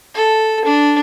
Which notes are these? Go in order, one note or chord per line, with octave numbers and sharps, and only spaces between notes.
A4
D4